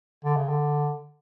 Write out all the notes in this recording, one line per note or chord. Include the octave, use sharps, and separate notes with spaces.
D3
C#3
D3